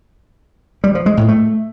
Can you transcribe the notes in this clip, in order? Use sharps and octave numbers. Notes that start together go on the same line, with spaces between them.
G3
F3
G#3
A2
A3